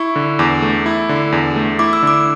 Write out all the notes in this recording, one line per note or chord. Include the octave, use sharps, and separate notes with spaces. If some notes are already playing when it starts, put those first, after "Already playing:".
Already playing: E4 C#6
D3
E2 D6
A3
E4
D3
E2
A3
E4 D6
E6
D3 D6